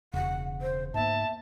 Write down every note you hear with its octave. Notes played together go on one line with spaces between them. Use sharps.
E1 C#3 F#5
C5
G#2 A#3 B3 E5 A5